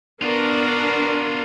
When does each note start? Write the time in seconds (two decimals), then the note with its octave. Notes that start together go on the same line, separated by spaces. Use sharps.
0.22 B3 D4 F4 F#4 A#4